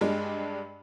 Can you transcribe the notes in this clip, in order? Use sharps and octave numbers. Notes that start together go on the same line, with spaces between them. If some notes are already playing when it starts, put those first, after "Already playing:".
G2 G#3 D4